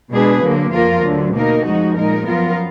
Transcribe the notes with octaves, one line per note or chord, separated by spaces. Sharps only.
B2 G#3 D4 G#4 B4
D3 F#3 A#3
F2 F3 A#3 F4 A#4
D2 D3 F#3
B2 A#3 D#4 A#4
F2 F3 G#3 D#4 F#4
A#2 G#3 D#4 A#4
F#2 F3 B3 F4 A#4